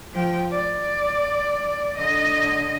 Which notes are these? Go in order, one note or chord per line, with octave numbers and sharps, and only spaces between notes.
F3 G5
D5
D3 D#5